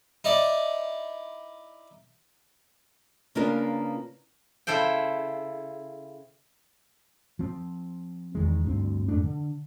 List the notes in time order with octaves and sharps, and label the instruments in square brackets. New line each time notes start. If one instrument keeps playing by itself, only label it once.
[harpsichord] D#4 E4 D5
[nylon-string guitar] C#3 A#3 B3 D4 F4 A#4
[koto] C#3 E4 A4 C5 G5
[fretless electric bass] F3 C4
E2 D#3 G#3
D2 G2 C4
F2 G#2 A3 D4
D3